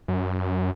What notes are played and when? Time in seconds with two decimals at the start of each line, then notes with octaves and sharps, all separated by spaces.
0.08 F#2